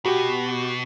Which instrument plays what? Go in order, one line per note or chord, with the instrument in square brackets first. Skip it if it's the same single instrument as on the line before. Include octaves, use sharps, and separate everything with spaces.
[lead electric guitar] B2 [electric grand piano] F#4 G4